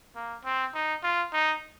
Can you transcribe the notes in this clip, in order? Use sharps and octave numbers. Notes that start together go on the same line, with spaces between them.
A#3
C4
D#4
F4
D#4